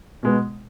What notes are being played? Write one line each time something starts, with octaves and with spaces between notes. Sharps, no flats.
B2 G#3 B3